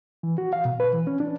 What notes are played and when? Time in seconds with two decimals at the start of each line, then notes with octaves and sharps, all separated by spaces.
0.23 E3
0.38 F#4
0.53 F5
0.65 B2
0.80 B4
0.93 E3
1.07 C#4
1.20 D4